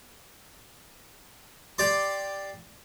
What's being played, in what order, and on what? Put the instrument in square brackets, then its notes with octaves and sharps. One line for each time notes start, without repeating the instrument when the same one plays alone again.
[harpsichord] G4 D5 C6